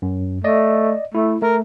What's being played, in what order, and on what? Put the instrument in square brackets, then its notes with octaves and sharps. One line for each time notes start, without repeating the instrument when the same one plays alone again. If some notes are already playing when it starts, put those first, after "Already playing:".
[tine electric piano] F#2
[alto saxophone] A3 [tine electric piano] D5 D#5
[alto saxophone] A3 [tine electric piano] E4
[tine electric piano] A3 [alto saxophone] A#4